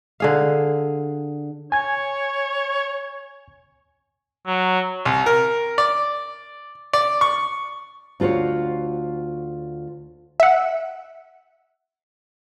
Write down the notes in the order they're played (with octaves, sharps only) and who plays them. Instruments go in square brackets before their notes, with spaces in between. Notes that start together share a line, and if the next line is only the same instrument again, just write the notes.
[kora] D3 G#4 F5
[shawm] C#5 [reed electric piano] G#5 G#6
[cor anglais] F#3
[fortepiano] C2
A#4
D5
D5
C#6
[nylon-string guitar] D2 F4 F#4 C5 C#5
[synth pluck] E5 F#5